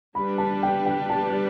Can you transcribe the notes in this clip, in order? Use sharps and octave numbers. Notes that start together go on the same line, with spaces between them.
G3 D4 G4 B4 B5
A5
G5
G5
A5